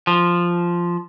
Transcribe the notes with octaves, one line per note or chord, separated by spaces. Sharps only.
F3